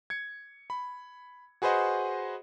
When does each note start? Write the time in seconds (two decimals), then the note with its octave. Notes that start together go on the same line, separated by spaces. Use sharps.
0.10 G#6 C#7
0.70 B5
1.62 F#4 G#4 B4 C5 D#5 F#5